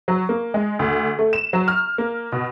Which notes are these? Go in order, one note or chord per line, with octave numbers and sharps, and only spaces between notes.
F#3
A#3
G#3
D2
A3
E7
F#3
F6
A#3
B2